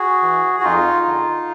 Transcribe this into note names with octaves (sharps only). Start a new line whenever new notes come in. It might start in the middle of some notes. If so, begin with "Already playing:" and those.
Already playing: F#4 G#4
E3
F#4
F2 D#4 F4
D3